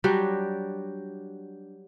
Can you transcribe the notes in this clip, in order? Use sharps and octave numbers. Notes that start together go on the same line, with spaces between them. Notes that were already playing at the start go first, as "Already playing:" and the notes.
F#3 G3 D4 F#4